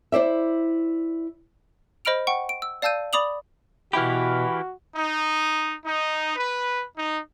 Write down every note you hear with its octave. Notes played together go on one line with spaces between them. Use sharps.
E4 C5 D5 E5
C5 D#5 B5 F6 D7 F7
F#5 G5 C#6
D7
E6
D5 F5 A5 E6 G6 D#7
D5 B5 D6 D#6 F7 F#7
B2 E3 E4 F#4 G4 B5 F6
D#4
D#4
B4
D#4